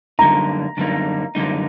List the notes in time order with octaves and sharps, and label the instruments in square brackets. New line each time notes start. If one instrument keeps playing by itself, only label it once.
[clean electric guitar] F#2 D3 G3 A#3 D#4 [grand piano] A#5
[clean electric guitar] F#2 D3 G3 A#3 D#4
F#2 D3 G3 A#3 D#4